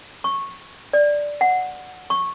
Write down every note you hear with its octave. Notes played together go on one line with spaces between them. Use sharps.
C#6
D5
F#5
C#6